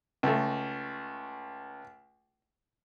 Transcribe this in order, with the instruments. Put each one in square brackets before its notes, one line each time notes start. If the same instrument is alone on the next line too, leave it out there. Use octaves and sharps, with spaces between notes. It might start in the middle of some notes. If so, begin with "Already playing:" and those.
[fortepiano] C#2 A3